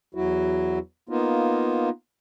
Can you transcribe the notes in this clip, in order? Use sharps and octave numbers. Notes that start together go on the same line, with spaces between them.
E2 F#3 E4 F#4
A#3 B3 D#4 F4